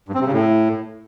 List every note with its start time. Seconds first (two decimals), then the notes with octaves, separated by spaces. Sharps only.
0.09 G2
0.14 C4
0.20 C3
0.26 C#3
0.32 A2